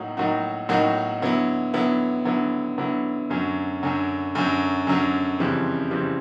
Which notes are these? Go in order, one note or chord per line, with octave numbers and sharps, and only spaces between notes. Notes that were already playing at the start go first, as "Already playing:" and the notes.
Already playing: A2 F#3 A#3 D#4 F#4
A2 F#3 A#3 D#4 F#4
A2 F#3 A#3 D#4 F#4
D3 F#3 B3 E4
D3 F#3 B3 E4
D3 F#3 B3 E4
D3 F#3 B3 E4
F#2 D3 F#3
F#2 D3 F#3
F#2 D3 F#3
F#2 D3 F#3
F2 C#3 E3 G3 C4
F2 C#3 E3 G3 C4